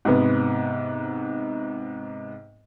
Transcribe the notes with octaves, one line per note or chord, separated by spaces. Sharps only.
G#2 C3 B3